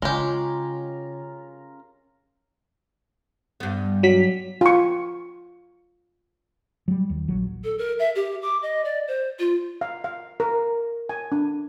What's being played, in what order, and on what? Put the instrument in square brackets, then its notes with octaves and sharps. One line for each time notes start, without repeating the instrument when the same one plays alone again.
[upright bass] C#3 [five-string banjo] G#3 G4 [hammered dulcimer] C#4 F4 A#4
[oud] G2 B3
[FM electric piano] F#3 B6
[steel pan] F4 C#6
[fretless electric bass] F#3 G3
D#2
A#1 F#3
[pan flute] A4
A#4
E5
G4
D6
D#5
D5
C5
F4
[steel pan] F5
F5
A#4
G#5
D4